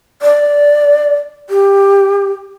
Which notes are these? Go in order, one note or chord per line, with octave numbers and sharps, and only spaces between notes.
D5
G4